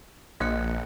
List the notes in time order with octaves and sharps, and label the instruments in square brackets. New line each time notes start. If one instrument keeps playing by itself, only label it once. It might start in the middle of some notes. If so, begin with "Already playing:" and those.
[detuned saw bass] A#1 [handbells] A#3 F#6 C#7